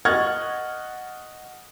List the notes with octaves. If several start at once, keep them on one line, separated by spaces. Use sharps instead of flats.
D#5 F#5 C#6 F6 G#6 A6